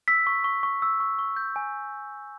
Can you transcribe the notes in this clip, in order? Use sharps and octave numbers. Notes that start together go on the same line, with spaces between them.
E6 B6
C#6
C#6
C#6
E6
C#6
C#6
G6
G#5